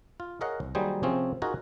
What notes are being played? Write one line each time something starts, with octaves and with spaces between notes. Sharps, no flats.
F4
G#4 A#4 C#5 D#5 F5 F#5
C2
D#3 F#3 G3 A#3 G#4 C5
C3 F3 C4 C#4 G#4
D#4 F4 F#4 G#4 A#4 D#5